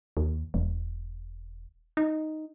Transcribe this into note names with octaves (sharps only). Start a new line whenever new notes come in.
D#2
E1
D#4